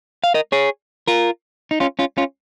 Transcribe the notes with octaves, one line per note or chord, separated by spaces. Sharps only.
F5
A#4 D#5
G#4 C#5
F4 A#4
D#4
C#4 F4
C#4 F4
C#4 F4